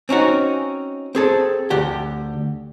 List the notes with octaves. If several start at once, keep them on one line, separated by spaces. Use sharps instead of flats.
C4 C#4 D#4 F#4
C4 G#4 A4
D2 G4 F#5